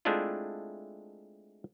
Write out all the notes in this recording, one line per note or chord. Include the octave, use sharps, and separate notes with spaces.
G#3 A3 C4 D4 E4 F4